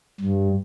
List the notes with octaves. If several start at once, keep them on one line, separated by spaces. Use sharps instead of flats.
G2